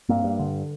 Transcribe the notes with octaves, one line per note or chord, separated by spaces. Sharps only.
G2 A#3 C4
G2
D3